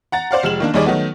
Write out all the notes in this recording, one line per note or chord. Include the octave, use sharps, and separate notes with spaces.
F#5 A#5 A6
C5 D5 F5 F#5
F1 G#3 F6 E7 F#7
D#3 A#3 D4
D#2 G3 D#4 G#4 D5 D6
D#3 F#3 A3 B3